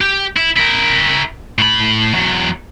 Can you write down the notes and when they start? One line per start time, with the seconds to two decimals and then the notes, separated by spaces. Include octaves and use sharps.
0.01 G4
0.37 E4
0.57 E4 A#4
1.59 A2 B5
2.13 E2 F#3